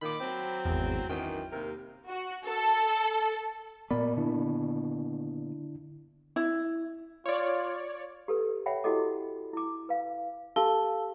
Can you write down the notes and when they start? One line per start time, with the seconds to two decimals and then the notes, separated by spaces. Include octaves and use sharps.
0.01 A#2 D#3 B5 D6
0.20 F#3 C4
0.65 G#1 E2
1.09 F#2 D#3 E3 G5
1.52 D#2 C3 A#4
2.08 F#4
2.46 A4
3.91 A#2 B3 A#4 D5 B5
4.17 D3 D4 E4
6.36 E4
7.26 F4 C#5 D5
8.28 G4 A4 B4
8.66 C#5 E5 F#5 G5 B5
8.84 E4 F#4 G4 A4 D#5 D6
9.53 E4 D6
9.89 B4 F5
10.56 G4 A4 F5 A5 E6 G7